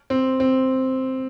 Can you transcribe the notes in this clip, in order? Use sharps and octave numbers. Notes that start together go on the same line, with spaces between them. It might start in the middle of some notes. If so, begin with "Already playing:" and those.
C4
C4